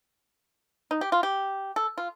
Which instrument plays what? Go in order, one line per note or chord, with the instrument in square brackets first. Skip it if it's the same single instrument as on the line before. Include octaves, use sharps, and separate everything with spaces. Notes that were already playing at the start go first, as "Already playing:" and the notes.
[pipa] D#4
G4
F4
G4
A4
F4